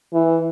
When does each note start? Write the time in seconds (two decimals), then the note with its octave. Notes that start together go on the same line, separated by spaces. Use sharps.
0.13 E3